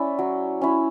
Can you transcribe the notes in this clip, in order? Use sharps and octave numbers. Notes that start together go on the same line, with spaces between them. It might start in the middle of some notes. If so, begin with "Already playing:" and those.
Already playing: C#4 E4 D5
F#3
C#4 E4